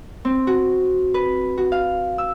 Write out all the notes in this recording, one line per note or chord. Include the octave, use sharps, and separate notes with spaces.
C4
F#4
B4
F#4
F5
E6